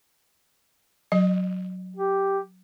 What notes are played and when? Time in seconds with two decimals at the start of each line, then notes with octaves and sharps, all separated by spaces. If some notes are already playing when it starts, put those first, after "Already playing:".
1.12 F#3 D#5
1.97 G4